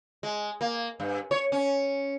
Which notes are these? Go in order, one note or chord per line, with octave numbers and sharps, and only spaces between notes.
G#3
A#3
G2
C#5
C#4